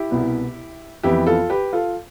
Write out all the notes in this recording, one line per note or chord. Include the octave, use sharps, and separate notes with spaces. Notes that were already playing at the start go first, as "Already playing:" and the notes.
Already playing: E4 G4
C2 B2 B3
F2 E3 B3 E4 G4
F4 A4
G4 B4
F4 A4